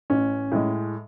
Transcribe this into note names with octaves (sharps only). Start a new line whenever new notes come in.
A1 C#4
A2 G#3